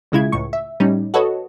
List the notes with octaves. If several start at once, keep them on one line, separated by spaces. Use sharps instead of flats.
B1 C#3 G#3 E4 F4 G#6
C#2 A2 C#6
E5
A2 G3 C#4 D#4
F#4 A4 B4 C#5 D#5